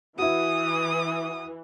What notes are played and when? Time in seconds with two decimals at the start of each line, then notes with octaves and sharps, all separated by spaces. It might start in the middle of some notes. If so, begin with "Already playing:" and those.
0.18 E3 E4 F#4 D#6